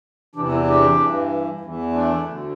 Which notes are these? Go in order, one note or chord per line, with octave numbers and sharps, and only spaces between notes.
E2 C3 E3 D4 G4
C4 E4
D4 G4
G2 E3
E2 E3
A3 D4
D2 D3